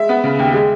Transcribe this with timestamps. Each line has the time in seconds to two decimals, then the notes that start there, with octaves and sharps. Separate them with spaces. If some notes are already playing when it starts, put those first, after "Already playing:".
Already playing: G#3 E5
0.09 B3
0.24 C#3
0.39 D#2
0.53 G#3